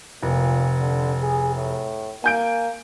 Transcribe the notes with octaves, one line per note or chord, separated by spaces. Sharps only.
F1 A#2
D3
G#4
A2
A#3 G#5 G6 D7